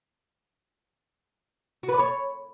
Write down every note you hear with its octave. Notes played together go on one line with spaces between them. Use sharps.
F#4
B4
D5
C#5